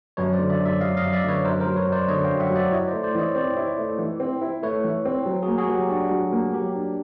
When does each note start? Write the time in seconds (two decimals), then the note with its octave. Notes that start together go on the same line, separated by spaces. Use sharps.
0.17 F#2 B4 C#5
0.33 C5 D5
0.39 D3
0.50 D5 E5
0.60 F#2
0.65 D5 E5
0.81 F#3 D#5 F5
0.97 D#5 F5
1.02 F#2
1.13 D5 E5
1.24 D3 B4 C#5
1.44 F#2 A#4 C5
1.60 A#4 C5
1.66 F#3
1.76 B4 C#5
1.87 F#2
1.92 C5 D5
2.08 D3 C#5 D#5
2.24 F5 G5
2.30 F#2
2.40 E5 F#5
2.50 F#3
2.56 D5 E5
2.72 E4 C#5 D#5
2.88 C5 D5
2.93 A3
3.03 C5 D5
3.15 E3 D5
3.19 C#5 D#5
3.35 C4 C5 D5
3.57 E4
3.78 A3
3.99 E3
4.20 C4
4.41 E4
4.63 A3 B4 C#5
4.84 E3
5.05 C4
5.26 F#3
5.42 F#4 G#4
5.48 A#3
5.58 F#4 G#4
5.69 F#3
5.74 G4
5.90 D4 F#4
6.11 F#3
6.32 A#3
6.54 F#3 G4
6.75 D4